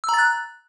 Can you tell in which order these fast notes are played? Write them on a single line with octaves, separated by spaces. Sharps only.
E6 A#5 A6 F#6